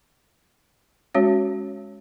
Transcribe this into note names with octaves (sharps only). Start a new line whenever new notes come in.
G#3 C#4 F#4 C#5